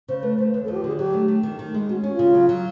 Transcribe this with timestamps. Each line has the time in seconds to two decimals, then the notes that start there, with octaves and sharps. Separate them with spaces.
0.08 C#3 C5
0.23 A3 B4
0.38 A3 C5
0.53 D#2 B4
0.65 A4
0.68 F3 F#4
0.76 G4
0.84 D3 G#4
0.99 F#3 G4
1.13 A3
1.28 A3
1.43 D#3
1.59 D#3
1.74 G#3
1.89 C#4 F#4
2.03 C#4
2.12 F4
2.19 C#3
2.35 F#3
2.49 F#3